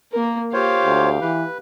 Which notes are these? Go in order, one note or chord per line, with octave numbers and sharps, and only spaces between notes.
A#3 A#4
F4 G4 C5 C#5 F5
D2
E3 B4